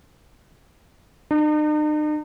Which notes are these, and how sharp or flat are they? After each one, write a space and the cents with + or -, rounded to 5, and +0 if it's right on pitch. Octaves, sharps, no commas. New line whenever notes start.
D#4 -45